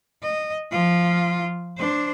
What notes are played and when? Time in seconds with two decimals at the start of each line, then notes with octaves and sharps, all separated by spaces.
0.23 D#5
0.72 F3 F4
1.77 D4 C5